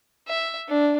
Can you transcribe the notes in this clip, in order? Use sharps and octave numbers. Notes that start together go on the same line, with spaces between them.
E5
D4